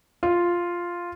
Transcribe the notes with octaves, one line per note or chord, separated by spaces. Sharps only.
F4